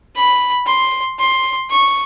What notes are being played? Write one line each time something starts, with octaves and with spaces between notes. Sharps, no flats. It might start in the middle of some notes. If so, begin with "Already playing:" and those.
B5
C6
C6
C#6